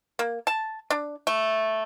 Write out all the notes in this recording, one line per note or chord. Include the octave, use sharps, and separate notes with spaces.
A#3
A5
D4
A3